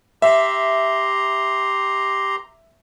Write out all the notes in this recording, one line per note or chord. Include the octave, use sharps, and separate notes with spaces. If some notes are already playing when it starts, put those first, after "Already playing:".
G4 E5 A#5 C6